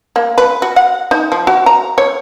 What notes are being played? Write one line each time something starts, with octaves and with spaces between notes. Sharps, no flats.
A#3
B4
F#4
F#5
D#4
F3
F#4
A#5
C#5